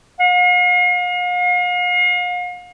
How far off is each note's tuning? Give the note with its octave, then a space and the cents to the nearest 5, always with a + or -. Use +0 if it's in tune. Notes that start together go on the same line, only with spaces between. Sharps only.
F5 +40